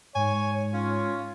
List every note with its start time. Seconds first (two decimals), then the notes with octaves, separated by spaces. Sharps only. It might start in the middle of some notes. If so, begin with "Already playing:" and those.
0.15 G#2 C#5 G#5
0.74 C#4 F4